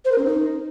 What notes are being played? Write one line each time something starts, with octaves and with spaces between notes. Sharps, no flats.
C5
A#4
C#4
D#4